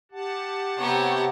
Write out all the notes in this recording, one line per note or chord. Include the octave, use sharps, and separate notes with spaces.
G4 F#5 A5
C3 B3 C#5 G5 A#5